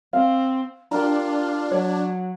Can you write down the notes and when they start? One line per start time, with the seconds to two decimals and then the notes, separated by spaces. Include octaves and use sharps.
0.13 C4 F5
0.91 D4 F4 G4 A#4 A#5
1.71 F#3 C#5